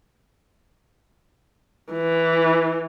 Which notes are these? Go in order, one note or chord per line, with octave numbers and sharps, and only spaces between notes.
E3